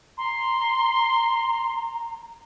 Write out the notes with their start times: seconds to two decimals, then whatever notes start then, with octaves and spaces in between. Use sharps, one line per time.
0.17 A#5 C6